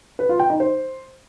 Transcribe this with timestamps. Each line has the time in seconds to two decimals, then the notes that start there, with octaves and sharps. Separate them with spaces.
0.19 B4
0.29 F4
0.39 G5
0.50 D#4
0.60 C5